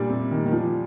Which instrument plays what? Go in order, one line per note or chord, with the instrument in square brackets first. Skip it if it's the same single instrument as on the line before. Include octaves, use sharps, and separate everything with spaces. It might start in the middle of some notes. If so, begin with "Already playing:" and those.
Already playing: [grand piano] A#2 G3 D4
[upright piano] C3
D#3
D#3
F3